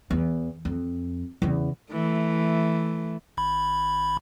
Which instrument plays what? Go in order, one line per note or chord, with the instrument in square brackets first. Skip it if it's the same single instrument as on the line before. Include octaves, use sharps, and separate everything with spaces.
[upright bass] E2
F2
E2 C#3
[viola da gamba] E3 A3
[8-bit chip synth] G#1 B5